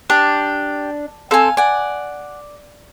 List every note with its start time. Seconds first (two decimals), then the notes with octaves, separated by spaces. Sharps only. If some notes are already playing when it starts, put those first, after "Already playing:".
0.10 D4 G4
1.31 C4 A4 F5 G#5
1.57 D5 F#5 G#5